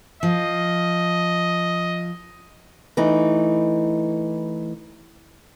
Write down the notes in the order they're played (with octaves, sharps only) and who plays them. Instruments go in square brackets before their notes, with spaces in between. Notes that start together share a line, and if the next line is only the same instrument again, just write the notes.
[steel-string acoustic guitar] F3 [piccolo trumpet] D#5
[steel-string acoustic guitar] E3 A3 D#4